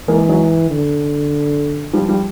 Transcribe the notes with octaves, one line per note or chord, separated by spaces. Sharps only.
E3 G#3 A#3
F#3 G#3
D3
F3 G3
F3 G3